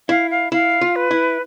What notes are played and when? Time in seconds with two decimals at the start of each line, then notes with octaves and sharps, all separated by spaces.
0.09 E4 F5
0.31 F5
0.52 E4 F5
0.81 F4
0.96 B4
1.11 E4